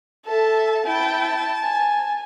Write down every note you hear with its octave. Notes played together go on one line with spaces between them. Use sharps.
A4 E5 A5
E4 G5 A5
G#5